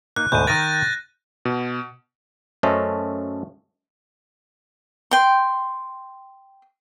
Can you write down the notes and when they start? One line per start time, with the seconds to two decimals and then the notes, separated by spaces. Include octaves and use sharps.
0.16 A#3 D#4 F#6
0.32 D2 G#2 B2 G6 D#7
0.47 D#3 A#4 A6 A#6 D#7
1.45 B2
2.63 F#2 A3 C#4 A4 C5 D#5
5.11 G5 C6